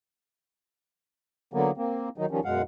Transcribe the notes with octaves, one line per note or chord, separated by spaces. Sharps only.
D3 F#3 A#3 B3
A#3 C4
D#3 F#3 D#4
D#3 F3 G3 C#4
F#2 B2 G#3 F5 F#5